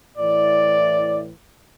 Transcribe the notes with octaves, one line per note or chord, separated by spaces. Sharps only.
A2 E3 D5